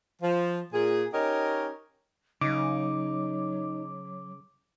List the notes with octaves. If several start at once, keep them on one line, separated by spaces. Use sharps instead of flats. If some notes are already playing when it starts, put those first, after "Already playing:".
F3
A#2 G#4
C#4 D#4 G4 A#4 C#5 D#5
C#3 F#3 D#4 D6